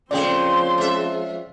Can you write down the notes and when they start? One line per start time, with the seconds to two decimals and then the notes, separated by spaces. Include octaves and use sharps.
0.11 C#3 F3 A3 C4 G#4 D5 G5 C6
0.78 G#3 E5